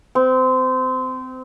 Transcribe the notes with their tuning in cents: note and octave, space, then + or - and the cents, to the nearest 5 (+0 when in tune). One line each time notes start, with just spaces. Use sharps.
C4 -25